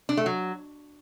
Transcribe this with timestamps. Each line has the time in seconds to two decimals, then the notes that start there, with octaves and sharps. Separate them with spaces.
0.09 D4
0.17 A3
0.26 F#3